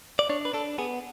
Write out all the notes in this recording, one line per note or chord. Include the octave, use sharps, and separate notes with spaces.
D5
D4 C#5
B4
D4 A4
B3 G#4